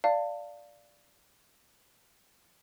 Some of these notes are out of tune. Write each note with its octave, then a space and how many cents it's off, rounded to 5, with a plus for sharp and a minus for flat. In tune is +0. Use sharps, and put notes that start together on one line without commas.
D5 +0 F5 -5 A5 +30